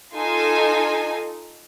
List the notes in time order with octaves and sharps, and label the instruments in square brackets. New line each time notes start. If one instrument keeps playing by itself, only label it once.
[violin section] D#4 F4 A4 G#5